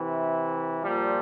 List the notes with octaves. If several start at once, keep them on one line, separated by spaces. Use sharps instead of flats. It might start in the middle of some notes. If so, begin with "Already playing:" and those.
Already playing: C3 E3
A#2 F3 G3